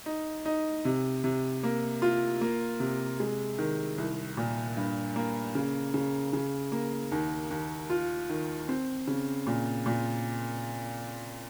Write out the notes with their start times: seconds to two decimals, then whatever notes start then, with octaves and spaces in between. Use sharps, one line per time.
0.06 D#4
0.45 D#4
0.85 C3
1.24 C3
1.63 A#3
2.02 F4
2.41 A#3
2.80 C3
3.20 G#3
3.58 D#3
3.98 C2
4.37 A#2
4.77 G2
5.16 A#3
5.55 C#3
5.94 C#3
6.33 C#3
6.72 A#3
7.12 D#2
7.51 D#2
7.90 F4
8.30 D#3
8.69 C4
9.07 C#3
9.47 A#2
9.86 A#2